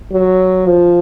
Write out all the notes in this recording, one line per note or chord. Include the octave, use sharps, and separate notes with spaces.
F#3
F3